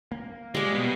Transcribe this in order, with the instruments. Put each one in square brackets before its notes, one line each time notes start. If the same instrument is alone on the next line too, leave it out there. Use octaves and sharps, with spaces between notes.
[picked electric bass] A#3
[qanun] G3 D5 [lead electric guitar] G#3
[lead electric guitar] B2 B3